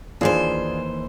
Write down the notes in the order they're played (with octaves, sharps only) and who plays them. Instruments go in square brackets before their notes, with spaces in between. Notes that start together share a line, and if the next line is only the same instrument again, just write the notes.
[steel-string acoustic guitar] D#2 E3 C5 [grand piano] D4 F4 G#4